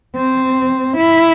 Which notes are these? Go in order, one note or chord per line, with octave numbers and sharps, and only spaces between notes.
C4
E4